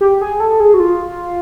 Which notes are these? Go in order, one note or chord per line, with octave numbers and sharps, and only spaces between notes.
G4
G#4
A4
G#4
F#4
F4